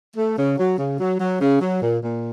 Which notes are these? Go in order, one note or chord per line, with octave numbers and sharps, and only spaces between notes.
A3
C#3
F#3
C#3
F#3
F#3
C#3
F#3
A#2
A#2